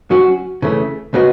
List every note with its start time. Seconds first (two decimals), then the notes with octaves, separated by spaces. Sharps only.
0.11 F#3 C#4 F#4
0.62 C#3 E3 A3
1.14 C#3 G#3 B3 F#4